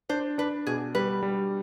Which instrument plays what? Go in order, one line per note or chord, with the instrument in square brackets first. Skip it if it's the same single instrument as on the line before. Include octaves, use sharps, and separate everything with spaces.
[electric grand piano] D4 [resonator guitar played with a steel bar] C5
[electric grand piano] D4 [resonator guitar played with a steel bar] B4
[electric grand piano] B2 [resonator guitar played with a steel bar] G#4
[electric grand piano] G3 [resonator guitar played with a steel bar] B4
[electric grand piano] G3